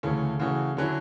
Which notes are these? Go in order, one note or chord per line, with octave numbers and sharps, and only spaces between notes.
D2 C#3 E3 A3 C#4
C#3 E3 A3 C#4 F#4
D3 F#3 C#4 E4